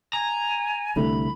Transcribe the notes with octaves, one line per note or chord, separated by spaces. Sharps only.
G#5 A#5
C2 D3 A3 B5